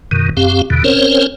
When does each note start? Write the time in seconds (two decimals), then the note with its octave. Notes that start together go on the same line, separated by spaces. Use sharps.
0.11 F#2 B2 D#3
0.37 F#2 C4 G4 F5
0.70 E2 B2 D3
0.84 C4 C#4 A#4 C5 C#5